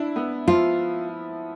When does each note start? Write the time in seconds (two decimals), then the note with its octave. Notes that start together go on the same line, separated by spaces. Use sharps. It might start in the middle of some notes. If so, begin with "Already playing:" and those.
Already playing: D4 E4
0.16 B3
0.48 F3 F4